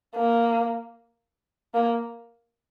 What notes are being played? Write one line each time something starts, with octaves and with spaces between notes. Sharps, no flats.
A#3
A#3